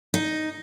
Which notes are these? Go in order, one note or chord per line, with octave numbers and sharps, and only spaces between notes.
D#4